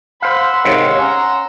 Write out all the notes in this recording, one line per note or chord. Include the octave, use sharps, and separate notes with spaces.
C5 F5 F#5 B5 C6 E6
G#2 C3 D#3 C#5 F5
C#4 A#5